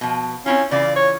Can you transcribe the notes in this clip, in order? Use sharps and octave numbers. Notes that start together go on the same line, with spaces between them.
B2 F3
C4 C#4 E4 F4
C#3 E3 F4 D5
C#5